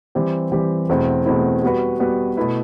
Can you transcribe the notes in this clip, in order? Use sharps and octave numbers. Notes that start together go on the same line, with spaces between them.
E3 G3 C4 G4
E3 G3 C4 G4
E2 B2 A3 C4 E4
E2 B2 A3 C4 E4
G3 B3 F#4 B4
G3 B3 F#4 B4
B2 A3 E4 B4